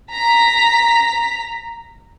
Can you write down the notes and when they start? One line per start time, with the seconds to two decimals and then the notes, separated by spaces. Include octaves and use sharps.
0.12 A#5 B6